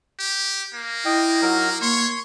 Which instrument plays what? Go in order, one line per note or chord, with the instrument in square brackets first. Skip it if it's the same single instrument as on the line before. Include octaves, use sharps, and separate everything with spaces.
[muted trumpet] G4
A#3
[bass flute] E4 [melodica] D#5 G5
[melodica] F#3 D#4 A#4
[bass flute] A#3 [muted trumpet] C#5 [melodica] C6 C#6